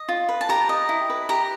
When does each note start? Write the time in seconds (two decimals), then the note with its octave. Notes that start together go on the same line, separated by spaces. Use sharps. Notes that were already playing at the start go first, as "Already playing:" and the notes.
Already playing: D#5
0.09 F4
0.29 B4
0.41 A5
0.49 G4 A#5
0.69 D#5
0.89 E4
1.10 B4
1.29 G4 A#5